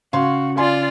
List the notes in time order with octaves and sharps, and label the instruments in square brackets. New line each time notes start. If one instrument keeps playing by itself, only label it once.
[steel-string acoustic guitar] C#3 [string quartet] F#4 [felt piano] F5 C6
[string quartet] F4 D5 [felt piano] F5 G#5 C6